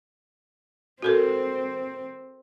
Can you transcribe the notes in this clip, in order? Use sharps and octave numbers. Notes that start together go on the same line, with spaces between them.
C4 F#4 A4 A#4